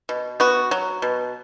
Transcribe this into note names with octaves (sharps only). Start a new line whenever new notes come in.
B2
B3 F#4
F#3
B2